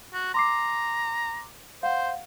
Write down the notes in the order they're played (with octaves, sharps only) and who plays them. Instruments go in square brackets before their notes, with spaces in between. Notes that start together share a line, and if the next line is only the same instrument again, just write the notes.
[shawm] F#4
[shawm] A#5 [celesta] C6 D6 C7
[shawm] C5 [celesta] F5 F#5